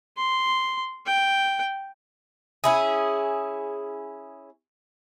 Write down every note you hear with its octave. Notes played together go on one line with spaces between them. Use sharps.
C6
G5
C#4 E4 G#4